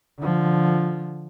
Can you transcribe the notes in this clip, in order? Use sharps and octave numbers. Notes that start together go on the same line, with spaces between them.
D3 F3